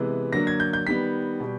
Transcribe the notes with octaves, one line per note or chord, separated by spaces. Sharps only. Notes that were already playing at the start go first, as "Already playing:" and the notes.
Already playing: C3 E3 G#3 B3
D3 F#3 A#3 A#6
G#6
G6
G6
D#3 G3 B3 B6
B2 G3